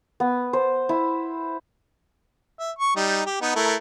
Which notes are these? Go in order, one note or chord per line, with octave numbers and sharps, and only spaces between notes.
B3
C5
E4
E5
C#6
G3 D#4
G4
B3 D#4
A3 E4 A#4